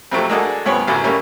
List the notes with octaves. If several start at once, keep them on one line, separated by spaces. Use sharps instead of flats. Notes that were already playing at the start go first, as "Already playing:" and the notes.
F2 C3 F#3 A3
G#3 A#3 D4 F#4 G#4 A4
C#2 G2 C3 B3 C#5
A1 F#2 D3 F#3
G3 A3 A#3 C#4